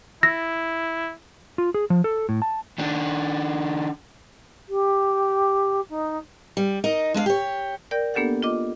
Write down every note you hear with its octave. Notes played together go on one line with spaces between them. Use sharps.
E4 E6 A#6
F4
G#4
F3
A4
A2
A5
D#3 D4
G4
D#4
G3
D#4 A#4 D#5
G#3 D4 D#5 F5
G4 C#5
A#4 D5 G5 G6
A#3 B3 D4 G4 A4 F#5
F4 D#5 D6